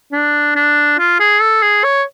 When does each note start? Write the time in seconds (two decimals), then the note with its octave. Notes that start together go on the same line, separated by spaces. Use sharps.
0.12 D4
0.56 D4
0.99 F4
1.20 G#4
1.41 A4
1.62 G#4
1.84 C#5